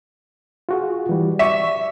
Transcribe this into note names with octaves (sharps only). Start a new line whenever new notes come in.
F4 F#4 G#4
E3 G3
D5 E5 C#6